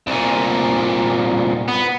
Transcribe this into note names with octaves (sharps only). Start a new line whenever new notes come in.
C2 A#2
B3